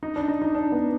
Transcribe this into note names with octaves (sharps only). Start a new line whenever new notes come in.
D#4
D4
D#4
D#4
D4
B3